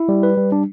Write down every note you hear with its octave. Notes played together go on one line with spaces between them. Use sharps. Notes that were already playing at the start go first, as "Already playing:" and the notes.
Already playing: E4
G3
B4
G3
D4